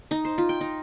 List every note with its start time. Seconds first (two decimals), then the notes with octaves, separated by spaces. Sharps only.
0.11 D#4
0.25 C5
0.38 F4
0.49 G5
0.61 D#4